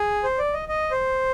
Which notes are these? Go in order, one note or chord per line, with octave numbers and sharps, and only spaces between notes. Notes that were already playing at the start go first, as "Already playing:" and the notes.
Already playing: G#4
C5
D5
D#5
D#5
C5